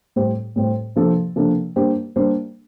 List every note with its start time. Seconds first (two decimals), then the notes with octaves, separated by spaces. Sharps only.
0.16 A2 G3 C4 G4 C5
0.56 A2 G3 C4 G4 C5
0.96 C3 F3 A#3 D4 A4
1.36 C3 F3 A#3 D4 A4
1.76 G3 A#3 D4 G4 C5
2.16 G3 A#3 D4 G4 C5